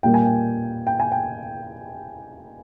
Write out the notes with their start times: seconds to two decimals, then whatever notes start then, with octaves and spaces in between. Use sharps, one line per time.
0.03 A#2 G3 A#3 G5
0.14 G#5
0.25 G5
0.87 G5
1.00 G#5
1.12 G5